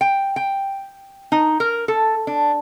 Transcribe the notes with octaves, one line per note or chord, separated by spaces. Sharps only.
G5
G5
D#4
A#4
A4
D4